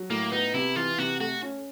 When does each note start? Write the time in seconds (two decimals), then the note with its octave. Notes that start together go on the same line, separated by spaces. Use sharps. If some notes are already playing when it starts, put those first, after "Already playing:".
Already playing: F#3
0.10 A2 A#3
0.31 B3 D#4
0.54 C3 E4
0.76 E3 F4
0.98 C3 F#4
1.20 A3 F#4
1.42 C#4